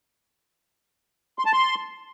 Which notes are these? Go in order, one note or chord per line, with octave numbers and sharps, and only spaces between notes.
C6
A5
C6